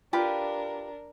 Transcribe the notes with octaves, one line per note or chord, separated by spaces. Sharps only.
D4 F4 G4 A#4 B4